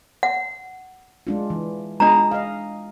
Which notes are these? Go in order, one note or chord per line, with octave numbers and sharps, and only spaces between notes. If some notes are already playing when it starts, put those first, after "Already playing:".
F#5
G#3 D4 F4
E3
G#3 D4 F4 D#5 A#5
D#5 F5